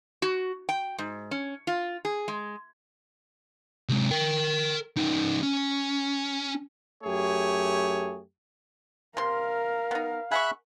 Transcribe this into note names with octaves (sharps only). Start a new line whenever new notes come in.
F#4
G5
G#2
C#4
F4
G#4
G#3
C3 G#3
A#4 G5
C#3 D#4
C#4
F#2 A3 G4 G#4 C#5
C3 A#4 F5 C6
B3 D#4
G#4 E5 F#5 B5 C#6 F#6